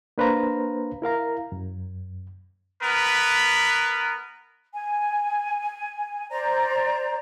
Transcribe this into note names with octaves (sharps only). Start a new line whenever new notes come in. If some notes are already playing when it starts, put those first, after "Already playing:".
A#3 D4 B4 C5 F5 A#5
E4 A#4 F5 A#5
F#2
B3 A#4 B4
G#5
C5 D5 A#5